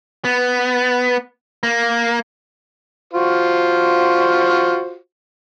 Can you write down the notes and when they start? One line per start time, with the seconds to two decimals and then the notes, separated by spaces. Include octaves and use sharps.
0.25 B3
1.63 A#3
3.13 F4 F#4 C5